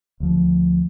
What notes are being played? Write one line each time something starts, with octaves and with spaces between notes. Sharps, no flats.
D2 F3